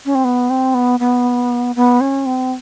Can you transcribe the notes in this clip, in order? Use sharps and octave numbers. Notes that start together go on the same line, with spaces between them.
C#4
C4
B3
C4
B3
B3
B3
C#4
C4